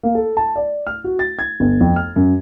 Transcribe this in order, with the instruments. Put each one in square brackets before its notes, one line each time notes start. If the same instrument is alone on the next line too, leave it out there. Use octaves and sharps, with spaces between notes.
[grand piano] A#3
A4
A5
D5
F6
F#4
A6
G#6
G1
F2
F6
F#2